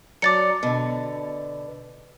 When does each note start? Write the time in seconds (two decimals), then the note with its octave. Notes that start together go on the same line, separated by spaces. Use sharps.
0.22 F#3 D5 A#5 D6 A6 C#7
0.63 B2 D3